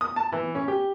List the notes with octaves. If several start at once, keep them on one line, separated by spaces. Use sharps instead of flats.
D#6
A5
E3
C#4
G4